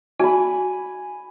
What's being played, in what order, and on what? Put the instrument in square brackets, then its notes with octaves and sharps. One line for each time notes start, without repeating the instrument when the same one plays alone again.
[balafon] F#4 [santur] G#5 B5